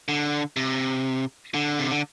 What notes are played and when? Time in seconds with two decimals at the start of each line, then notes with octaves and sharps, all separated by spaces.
0.08 D3
0.57 C3
1.54 D3
1.79 C3
1.91 D3